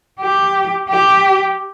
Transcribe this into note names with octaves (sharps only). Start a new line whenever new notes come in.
G4
G4